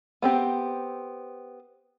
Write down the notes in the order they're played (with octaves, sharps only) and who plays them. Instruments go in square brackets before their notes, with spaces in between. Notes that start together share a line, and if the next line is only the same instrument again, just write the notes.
[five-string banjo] B3 C4 G4